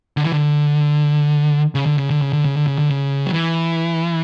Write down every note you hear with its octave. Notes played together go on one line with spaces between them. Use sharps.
D3
E3
D3
C#3
D3
C#3
D3
C#3
D3
C#3
D3
C#3
D3
C#3
F#3
E3